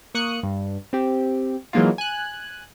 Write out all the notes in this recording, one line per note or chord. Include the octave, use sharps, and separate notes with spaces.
A#3 C#6 D#6 F#6 C#7
G2
C4 G4
E3 F#3 G#3 A#3 D#4 F4
G#5 F#6